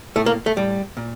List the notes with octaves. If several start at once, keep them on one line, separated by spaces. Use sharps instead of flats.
A2 A3
A#3
A3
A2 G3
A#2